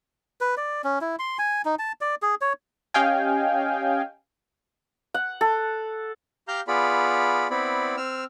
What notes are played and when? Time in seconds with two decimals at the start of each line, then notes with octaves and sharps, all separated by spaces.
0.41 B4
0.57 D5
0.84 C#4
1.01 E4
1.19 C6
1.39 G#5
1.65 D#4
1.79 A5
2.01 D5
2.22 G#4
2.41 C#5
2.94 C#4 G4 D#5 F5 G5 G#5
5.14 F#5
5.41 A4
6.48 G4 F5 A#5 F6 G6
6.68 B3 F4 G#4 D5 B5
7.50 B3 C4 E4 D5 B5
7.97 C4 E6 F6